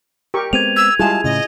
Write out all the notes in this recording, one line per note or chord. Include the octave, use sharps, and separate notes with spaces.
G4 A#4 C#6
G#3 B3 C4 G#6 D#7 F7
E6 G#6
G3 G#3 E4 F4 G#4 A5
A2 C#3 D#5